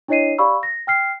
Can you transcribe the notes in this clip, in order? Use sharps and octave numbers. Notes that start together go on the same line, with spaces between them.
D4 E4 C#5 D#5 C7 D#7
G4 D5 F5 B5 C#6 E6
A#6
G5 F6 C7